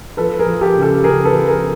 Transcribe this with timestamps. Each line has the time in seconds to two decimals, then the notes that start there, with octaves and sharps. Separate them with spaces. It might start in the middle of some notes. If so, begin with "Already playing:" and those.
0.17 F3 A4 B4
0.39 G#4 A#4
0.46 F3
0.61 G4 A4
0.75 C#3
0.82 G4 A4
1.04 C#3 G#4 A#4
1.25 A4 B4
1.33 F3
1.48 G#4 A#4